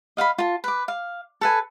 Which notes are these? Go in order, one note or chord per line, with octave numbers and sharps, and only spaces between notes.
D#5 F5 F#5 B5
F4 A5
B4 D6
F5
A4 B4 G#5